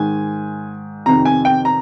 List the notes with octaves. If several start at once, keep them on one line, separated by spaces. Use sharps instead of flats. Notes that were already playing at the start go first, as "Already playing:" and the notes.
Already playing: G#2 D#3 G#5
F2 C3 D#3 A#5
G#5
G5
A#5